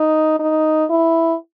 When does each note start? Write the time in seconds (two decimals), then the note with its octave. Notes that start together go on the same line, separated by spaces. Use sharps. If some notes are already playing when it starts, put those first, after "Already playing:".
Already playing: D#4
0.39 D#4
0.90 E4